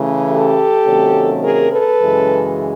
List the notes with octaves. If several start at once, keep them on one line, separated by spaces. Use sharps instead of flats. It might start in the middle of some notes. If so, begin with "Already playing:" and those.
Already playing: C#3 E3 A3
G4 A4
C3 D#3 F#3 A#3 C#4
G#4 A#4
A4 B4
F#2 C#3 E3 G#3